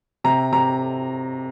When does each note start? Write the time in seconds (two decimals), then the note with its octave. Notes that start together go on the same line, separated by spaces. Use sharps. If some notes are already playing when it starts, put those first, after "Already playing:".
0.24 C3 A#5
0.52 C3 A#5